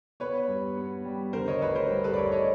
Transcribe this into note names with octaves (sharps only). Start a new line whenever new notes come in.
B3 B4 C#5
G2
B3
G3
D3 A#4 C5
C#5 D#5
A1 B4 C#5
A#4 C5
G2
A4 B4
D5
A1 B4 C#5
C#5 D#5